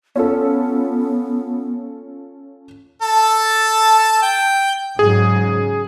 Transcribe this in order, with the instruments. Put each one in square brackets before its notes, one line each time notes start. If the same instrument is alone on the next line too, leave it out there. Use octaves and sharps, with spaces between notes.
[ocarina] B3 [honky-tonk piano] C#4 F4 A4
[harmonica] A4 A5
G5
[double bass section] G#2 C#3 F#3 [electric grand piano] G#4